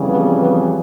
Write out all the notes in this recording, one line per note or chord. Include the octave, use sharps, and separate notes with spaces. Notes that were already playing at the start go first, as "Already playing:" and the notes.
Already playing: F2 C#3 E3 G3
B3
B3